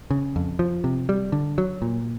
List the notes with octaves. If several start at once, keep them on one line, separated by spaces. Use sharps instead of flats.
C#3
F2
F3
C3
G3
D3
F#3
A#2